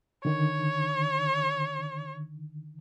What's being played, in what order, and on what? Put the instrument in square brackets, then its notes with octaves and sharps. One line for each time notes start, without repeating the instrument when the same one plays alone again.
[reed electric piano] D3 D#3 [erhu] C#5